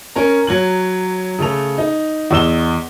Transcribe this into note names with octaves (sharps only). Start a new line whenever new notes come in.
C#4 A#4 A#5
F#3 G#6 F#7
C#3 A3 A4 F7
D#4
E2 D#5 E6 E7 G7